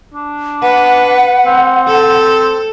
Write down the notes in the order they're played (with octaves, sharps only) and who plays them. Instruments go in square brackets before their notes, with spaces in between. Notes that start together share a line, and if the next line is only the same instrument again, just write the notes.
[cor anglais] D4
[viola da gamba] B4 [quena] F#5
[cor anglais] C4
[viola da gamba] A4